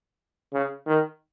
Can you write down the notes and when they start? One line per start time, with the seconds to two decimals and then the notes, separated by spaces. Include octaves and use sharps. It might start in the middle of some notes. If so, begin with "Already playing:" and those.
0.53 C#3
0.86 D#3